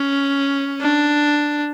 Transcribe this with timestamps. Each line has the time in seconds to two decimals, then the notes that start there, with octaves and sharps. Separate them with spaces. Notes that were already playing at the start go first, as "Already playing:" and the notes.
Already playing: C#4
0.81 D4